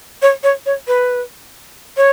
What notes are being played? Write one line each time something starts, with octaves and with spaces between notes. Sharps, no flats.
C#5
C#5
C#5
B4
C#5